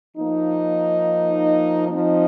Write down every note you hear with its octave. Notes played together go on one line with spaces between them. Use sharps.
F3 A#3 D#4
F3 C4 D#4